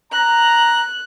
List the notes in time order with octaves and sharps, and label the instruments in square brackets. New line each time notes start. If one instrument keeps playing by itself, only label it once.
[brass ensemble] A#5 [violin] F#6